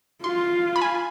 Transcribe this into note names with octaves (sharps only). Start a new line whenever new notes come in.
F4 C6
B5
G#5